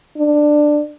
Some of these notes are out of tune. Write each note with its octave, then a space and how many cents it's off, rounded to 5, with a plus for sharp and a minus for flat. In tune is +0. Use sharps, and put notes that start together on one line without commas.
D4 +15